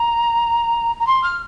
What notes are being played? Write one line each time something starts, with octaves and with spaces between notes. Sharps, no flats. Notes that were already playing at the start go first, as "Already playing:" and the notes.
Already playing: A#5
A#5
C6
F6